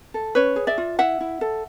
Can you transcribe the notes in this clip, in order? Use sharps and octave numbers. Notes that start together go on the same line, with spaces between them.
A4
C#4 B4 C#5
G#4
D5 E5
F4
E4 E5 F#5
E4
A4